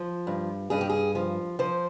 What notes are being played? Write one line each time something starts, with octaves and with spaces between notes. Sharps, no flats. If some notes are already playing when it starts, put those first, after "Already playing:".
Already playing: F3
G2
G2 G#4
G4
G#4
F3
F3 C5